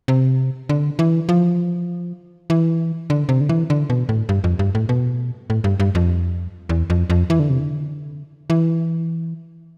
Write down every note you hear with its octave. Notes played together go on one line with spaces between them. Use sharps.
C3
D3
E3
F3
E3
D3
C3
D3
E3
D3
B2
A2
G2
F2
G2
A2
B2
A2
G2
G2
F2
E2
F2
F2
E3
D3
C3
D3
E3